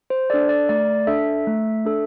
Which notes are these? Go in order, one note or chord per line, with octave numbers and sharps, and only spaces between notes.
C5
D4 A4 D5
D5
A3 D5
D4 A4 E5
A3
D4 A4